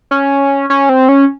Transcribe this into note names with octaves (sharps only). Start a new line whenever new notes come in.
C#4
C#4
C4
C#4